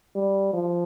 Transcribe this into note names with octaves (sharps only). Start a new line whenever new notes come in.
G3
F3